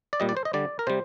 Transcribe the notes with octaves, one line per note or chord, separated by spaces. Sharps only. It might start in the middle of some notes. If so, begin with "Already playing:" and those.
D5
A#2 G3 D#5
D5
C5
D#5
D3 G3 D5
A#4
C3 G3 C5